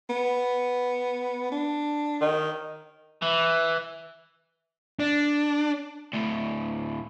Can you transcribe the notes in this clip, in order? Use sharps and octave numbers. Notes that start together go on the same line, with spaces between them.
B3
D4
D#3
E3
D4
D2 A2